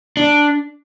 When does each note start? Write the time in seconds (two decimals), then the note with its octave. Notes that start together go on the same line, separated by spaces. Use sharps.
0.17 D4